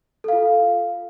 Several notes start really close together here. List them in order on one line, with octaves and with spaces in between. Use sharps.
A4 F5 F4